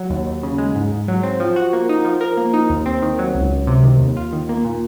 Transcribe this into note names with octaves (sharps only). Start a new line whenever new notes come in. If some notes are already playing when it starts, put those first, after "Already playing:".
Already playing: F#3
D#2
D#2
C#3
G#3
G#2
G#2
F#3
C4
F3
F#4
A#3
D#4
F3
A#4
A#3
D#4
D#2
C4
D#3
F#3
C#2
C#2
C3
D#3
D#2
F4
D#3
A#3
A#2